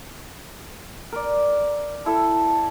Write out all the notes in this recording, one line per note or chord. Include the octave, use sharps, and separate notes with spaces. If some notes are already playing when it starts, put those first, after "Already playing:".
A#4 D5
E4 A4 A5